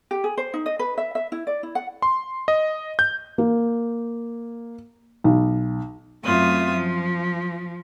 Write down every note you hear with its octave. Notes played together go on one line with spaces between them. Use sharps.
G4
G#4
C5
D#4
D#5
B4
E5
E5
E4
D5
E4
F#5
C6
D#5
G6
A#3
B1
F#2 A3 C4 F4 E5 D#6
F3